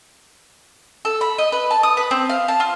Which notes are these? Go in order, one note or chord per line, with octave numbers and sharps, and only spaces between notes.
A4
B5
D#5
B4
A5
D#6
B4
C4
F5
A5
F4